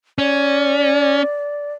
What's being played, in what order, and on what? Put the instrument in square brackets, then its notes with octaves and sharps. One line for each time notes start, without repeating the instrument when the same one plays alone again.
[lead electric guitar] C#4 [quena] D5